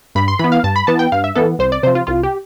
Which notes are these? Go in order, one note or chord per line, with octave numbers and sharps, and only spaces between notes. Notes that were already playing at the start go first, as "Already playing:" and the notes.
G2 B5
C6
E3 B3 B5
F5
G2 A5
B5
E3 B3 A5
G5
G2 F5
E5
E3 B3 A4
C2 C5
D5
C3 F3 C5
F4
C2 F4
G4